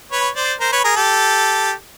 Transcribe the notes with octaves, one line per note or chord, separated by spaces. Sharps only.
B4 C#5
C5 D5
A#4 C5
B4 C#5
G#4 A#4
G4 A4